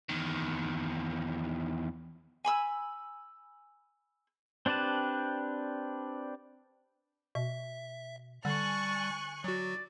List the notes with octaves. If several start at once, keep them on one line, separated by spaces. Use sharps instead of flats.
E2 D#3
G#5 B5 E6
C4 D4 G4 B4 A5
B2 E5
D3 G3 G#5 A5 C#6 F#6
F#3 F#4 D5